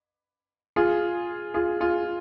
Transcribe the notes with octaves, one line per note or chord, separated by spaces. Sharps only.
F4 G#4
F4 G#4
F4 G#4